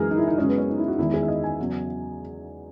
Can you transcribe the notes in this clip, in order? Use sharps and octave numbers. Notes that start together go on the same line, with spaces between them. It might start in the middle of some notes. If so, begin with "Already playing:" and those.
Already playing: F#2 E3 G#3 G#4 A#4
D#4
E4
D#4
F#2 C#3 G#3 C#4
B3
C#4
D#4
E4
F#4
E2 D#3 G#3 E4
G#4
E5
D#5
G#5
E2 C#3 F#3